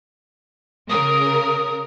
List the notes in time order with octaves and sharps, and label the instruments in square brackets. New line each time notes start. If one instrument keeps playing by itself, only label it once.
[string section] C#3 A#4 [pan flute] D#6